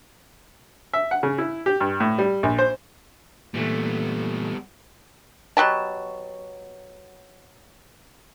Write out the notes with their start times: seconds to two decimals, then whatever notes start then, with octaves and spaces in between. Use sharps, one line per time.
0.93 E5
1.11 F#5
1.23 C#3
1.38 E4
1.66 G4
1.81 G2
2.00 A2
2.18 G3
2.43 A#1
2.58 C5
3.54 A#2 E3 G3 A3 B3
5.57 B2 F#3 G4 A5